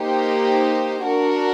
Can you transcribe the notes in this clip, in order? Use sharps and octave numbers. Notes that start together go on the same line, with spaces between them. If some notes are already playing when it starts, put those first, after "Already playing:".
Already playing: A#3 D#4 G4 C5
D4 F#4 A#4